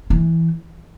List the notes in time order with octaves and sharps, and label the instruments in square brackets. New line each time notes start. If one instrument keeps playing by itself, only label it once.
[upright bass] E3